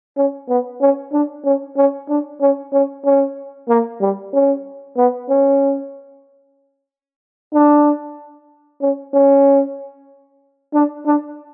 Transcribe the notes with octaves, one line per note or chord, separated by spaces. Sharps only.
C#4
B3
C#4
D4
C#4
C#4
D4
C#4
C#4
C#4
A#3
G3
C#4
B3
C#4
D4
C#4
C#4
D4
D4